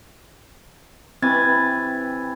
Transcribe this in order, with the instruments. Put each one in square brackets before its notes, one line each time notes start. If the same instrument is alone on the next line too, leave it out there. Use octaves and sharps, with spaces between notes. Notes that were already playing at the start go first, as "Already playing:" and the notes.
[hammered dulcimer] E3 G4 B5 [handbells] C4 G#6 A6